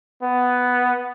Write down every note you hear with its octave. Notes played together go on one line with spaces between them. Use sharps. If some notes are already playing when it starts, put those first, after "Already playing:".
B3